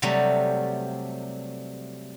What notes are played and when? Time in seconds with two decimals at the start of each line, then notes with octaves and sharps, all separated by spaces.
0.02 C3 F#3 G3 A3